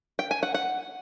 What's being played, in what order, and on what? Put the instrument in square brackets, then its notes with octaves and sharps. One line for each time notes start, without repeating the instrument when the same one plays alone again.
[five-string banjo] G5
G#5
F#5
F#5